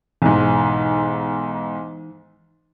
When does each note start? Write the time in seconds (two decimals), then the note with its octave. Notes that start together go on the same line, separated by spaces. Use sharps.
0.22 B1 G#2 E3 D#4